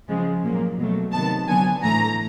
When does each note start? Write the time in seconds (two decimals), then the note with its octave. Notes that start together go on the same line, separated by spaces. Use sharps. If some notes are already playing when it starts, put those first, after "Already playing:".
0.08 C#3 F3 G#3
0.44 A#2 F#3 A#3
0.78 B2 F#3 A3
1.13 C3 D#3 F#3 B3 A5
1.48 D3 F#3 B3 G#5
1.83 A2 E3 A3 A#5